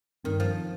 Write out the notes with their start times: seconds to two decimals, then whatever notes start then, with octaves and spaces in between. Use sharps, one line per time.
0.24 G2 D#3 G3 C4
0.40 F3